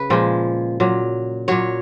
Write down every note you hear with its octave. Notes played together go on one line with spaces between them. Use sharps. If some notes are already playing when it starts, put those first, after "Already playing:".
Already playing: C#3 B4
A#2 F3 G#3
A#2 F#3
A#2 F#3 C#5